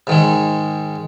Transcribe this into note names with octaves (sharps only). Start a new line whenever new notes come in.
G#2 D#3 G#3